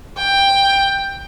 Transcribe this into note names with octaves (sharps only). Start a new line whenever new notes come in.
G5